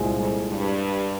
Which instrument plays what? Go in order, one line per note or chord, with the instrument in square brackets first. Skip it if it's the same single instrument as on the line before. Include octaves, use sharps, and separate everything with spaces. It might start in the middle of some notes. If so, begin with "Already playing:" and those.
Already playing: [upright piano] C2 A#2 G#3 C4 F4
[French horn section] F2
G2